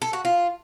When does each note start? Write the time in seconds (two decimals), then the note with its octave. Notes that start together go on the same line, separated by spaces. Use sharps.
0.02 A4
0.13 F#4
0.25 F4